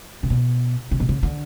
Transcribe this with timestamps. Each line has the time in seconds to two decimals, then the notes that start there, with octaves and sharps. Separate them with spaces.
0.23 C#3
0.30 B2
0.91 C#3
1.00 B2
1.09 C#3
1.23 D3